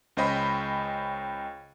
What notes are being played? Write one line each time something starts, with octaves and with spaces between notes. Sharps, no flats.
C#2 C#4 C5 D#5 G5 B5